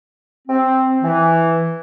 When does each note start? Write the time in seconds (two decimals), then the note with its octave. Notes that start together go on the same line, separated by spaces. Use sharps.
0.48 C4
1.02 E3